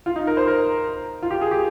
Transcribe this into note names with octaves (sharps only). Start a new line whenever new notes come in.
F4
D#4
A#4
C5
A#4
F4
G4
G#4
G4